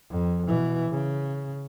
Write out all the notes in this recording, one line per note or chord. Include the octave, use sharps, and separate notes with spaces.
F2
B2 E3
C#3